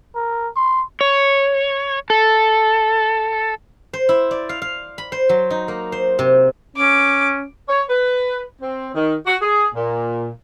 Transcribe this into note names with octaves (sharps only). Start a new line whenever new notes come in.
A#4
C6
C#5
A4
C5
E4
D5
F5
F5
B5
C5
F#3
D#4
A#3
C5
C3
C#4 D6
C#5
B4
C4
D#3
F#4
G#4
A#2